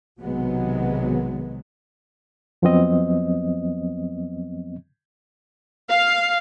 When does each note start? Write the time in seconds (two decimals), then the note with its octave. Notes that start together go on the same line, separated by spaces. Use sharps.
0.21 B1 C3 D#3 F#3 G#3 B3
2.62 F2 F3 F#3 B3 C4 D#5
5.90 F5